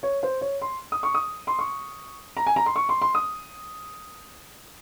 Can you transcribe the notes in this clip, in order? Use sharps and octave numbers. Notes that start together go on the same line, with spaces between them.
C#5
C5
C#5
C6
D#6
C#6
D#6
C6
C#6
A#5
G#5
A#5
C6
C#6
C6
C6
D#6